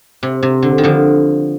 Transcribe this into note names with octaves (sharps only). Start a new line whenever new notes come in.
C3
C3
D3
D#3
D3 F3